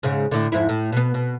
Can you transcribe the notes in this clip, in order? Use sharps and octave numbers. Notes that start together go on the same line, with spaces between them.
G#2 C#3
A2 D3
F2 G#2 E4
A2
B2 B3
B2